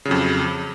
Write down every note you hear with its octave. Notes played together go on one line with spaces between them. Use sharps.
F2 C#3 F#3